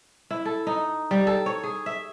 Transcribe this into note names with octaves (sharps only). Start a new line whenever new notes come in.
E4
A4
D#4
G3
A4
C#5
G#4
E5